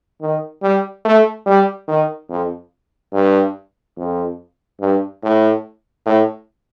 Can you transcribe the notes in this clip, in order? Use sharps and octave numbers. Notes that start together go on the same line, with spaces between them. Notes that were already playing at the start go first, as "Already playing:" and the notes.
D#3
G3
A3
G3
D#3
F2
G2
F2
G2
A2
A2